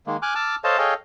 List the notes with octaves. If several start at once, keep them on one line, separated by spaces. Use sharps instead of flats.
D#3 G#3 A#3
G#5 D6 F6 F#6
A5 D6 E6 F6
A4 C5 C#5 D#5 F5 A5
G#4 A4 C#5 D#5 F5 G5